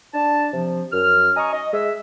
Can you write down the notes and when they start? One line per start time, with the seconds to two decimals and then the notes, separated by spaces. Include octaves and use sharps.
0.14 D4 A5
0.53 C3 F3
0.92 F#2 F6
1.36 D#5 G#5 A#5 C#6 D#6
1.52 D#5
1.73 G#3 E5